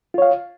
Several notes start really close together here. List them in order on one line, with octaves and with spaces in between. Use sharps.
F4 C#5 F5